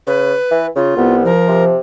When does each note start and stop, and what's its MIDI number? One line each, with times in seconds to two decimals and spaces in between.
0.07 0.34 49
0.07 0.67 71
0.51 0.67 52
0.76 0.94 49
0.76 1.16 65
0.97 1.29 36
0.97 1.23 59
1.25 1.74 53
1.25 1.64 70
1.48 1.80 48